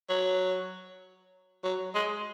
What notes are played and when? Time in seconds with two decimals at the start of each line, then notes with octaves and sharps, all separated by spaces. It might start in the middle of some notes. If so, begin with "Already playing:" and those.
0.09 F#3
1.64 F#3
1.95 G#3